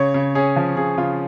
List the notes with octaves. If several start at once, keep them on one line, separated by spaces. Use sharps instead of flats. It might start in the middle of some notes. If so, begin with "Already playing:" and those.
Already playing: C#3 C#5
C#3
C#4 G#4
F3
C#3 G#4
C#3 F4